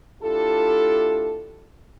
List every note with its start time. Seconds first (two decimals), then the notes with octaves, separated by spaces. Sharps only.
0.22 A3 D4 E4 F4 G4 A4